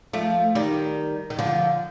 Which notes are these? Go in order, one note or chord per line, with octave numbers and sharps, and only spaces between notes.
F3 A3
D#3 G3
D#3
D3 F3